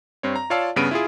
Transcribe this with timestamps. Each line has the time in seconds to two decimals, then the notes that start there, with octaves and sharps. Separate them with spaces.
0.23 G2 C4 C#5
0.36 A#5
0.50 F4 C#5 D5 F5 A5 E6
0.76 G2 C#3 B3 F6 D7 D#7
0.91 E4 F4 G#4